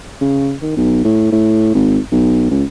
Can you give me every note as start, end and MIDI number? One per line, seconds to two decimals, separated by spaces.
0.21 0.54 49
0.62 0.72 51
0.77 1.01 35
1.04 1.30 45
1.32 1.70 45
1.75 1.99 32
2.12 2.47 35
2.51 2.64 37